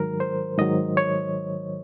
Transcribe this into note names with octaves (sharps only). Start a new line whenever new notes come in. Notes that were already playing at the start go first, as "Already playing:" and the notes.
Already playing: G#2 D#3 F#3 A#4
C5
G#2 D#3 F#3 D#5
C#5